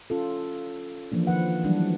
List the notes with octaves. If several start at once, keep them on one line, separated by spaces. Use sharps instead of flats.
C#4 F4 A4
E3 F3 A#3 D4
D#3 F3 B4 F#5
E3 F#3 G3 D4